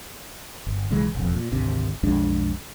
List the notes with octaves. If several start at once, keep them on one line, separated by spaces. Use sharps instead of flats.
G1
B1 C#3 E3 G#3
E1 A1 F2
A#2
G#1 D2 C3
B1 F2 G#3 D4